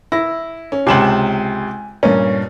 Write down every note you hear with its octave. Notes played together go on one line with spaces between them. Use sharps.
E4 A#6
C#4
C#2 C3 G#5 E7 F#7
G2 A#2 C#4